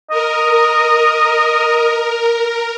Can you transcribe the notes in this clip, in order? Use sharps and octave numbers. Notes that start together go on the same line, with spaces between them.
A#4 D#5